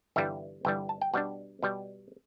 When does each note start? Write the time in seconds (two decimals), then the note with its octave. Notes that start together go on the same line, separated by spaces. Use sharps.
0.16 G1 G2 E3 G3 E5
0.65 G1 G2 E3 G3 G5
0.89 A5
1.01 G5
1.14 B2 G3 D4 F#5
1.63 B2 G3